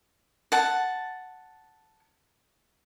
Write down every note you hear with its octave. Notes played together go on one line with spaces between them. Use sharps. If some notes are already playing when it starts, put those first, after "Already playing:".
F#5 A5